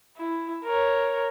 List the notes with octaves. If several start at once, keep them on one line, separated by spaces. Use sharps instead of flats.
E4
A#4 C#5